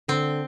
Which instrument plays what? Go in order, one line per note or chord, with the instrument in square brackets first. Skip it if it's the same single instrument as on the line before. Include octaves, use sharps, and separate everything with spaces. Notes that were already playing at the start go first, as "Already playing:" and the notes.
[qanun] D3 [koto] C4